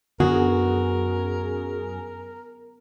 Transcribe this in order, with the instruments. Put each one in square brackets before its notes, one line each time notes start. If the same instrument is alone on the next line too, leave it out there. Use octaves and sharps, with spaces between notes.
[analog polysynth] F#2 G#4 [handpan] D3 B3 [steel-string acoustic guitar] F#4 [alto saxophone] A#4